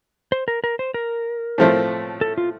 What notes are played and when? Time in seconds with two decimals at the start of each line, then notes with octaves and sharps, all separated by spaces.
0.32 C5
0.48 A#4
0.64 A#4
0.79 C5
0.94 A#4
1.58 A2 F3 A3 C4
2.21 A4
2.38 F4